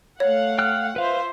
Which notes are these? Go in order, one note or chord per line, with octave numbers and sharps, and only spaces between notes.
A3 C#5 F5 F#5
G5 F6 F#6
F4 B4 C5 E5 F5